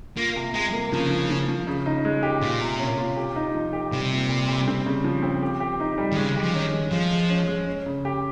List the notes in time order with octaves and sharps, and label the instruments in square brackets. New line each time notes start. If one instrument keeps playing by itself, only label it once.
[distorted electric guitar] A#3 [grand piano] F4
[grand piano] C3
[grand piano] C3 [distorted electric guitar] G#3
[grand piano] A#3
[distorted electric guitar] C#3 [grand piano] F3
[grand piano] F3
F3
F3
C#3
D#4
G#3
G4
[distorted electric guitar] A#2 [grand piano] F4
[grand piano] C3
C#4
F4
G4
D#4
F3
G4
[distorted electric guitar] C3 [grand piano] G3
[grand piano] A#2
G3
G3
C4
C#3
F3
C4
G4
G4
D#4
G3
[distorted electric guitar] D#3
[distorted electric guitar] C#3 [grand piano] G#3
[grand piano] G4
[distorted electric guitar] F3
[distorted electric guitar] D#3 [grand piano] C#4
[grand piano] G#3
[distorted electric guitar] F3 [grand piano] G#3
[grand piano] G#3
C#4
G#3
C#4
C#3
G4